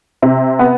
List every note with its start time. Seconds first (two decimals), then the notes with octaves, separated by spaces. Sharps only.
0.22 C3
0.59 B3